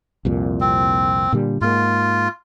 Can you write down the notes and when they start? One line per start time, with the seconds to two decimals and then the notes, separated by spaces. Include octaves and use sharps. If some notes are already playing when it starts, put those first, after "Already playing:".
0.25 C2 F2 A#2
0.61 C4
1.33 A#2 D3 G3
1.61 G#2 A#3 F4